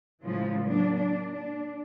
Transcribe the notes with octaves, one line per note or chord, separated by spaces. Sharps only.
A2 C#3 E3 F3 G#3
F#3 A#3 D4
D4
D4